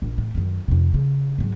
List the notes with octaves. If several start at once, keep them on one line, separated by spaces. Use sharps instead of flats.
A#1
A2
F#2 D#3
F2 C3
C#3
G#2 F#3